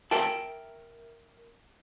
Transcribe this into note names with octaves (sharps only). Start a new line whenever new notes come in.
A#4 E5 G5 A5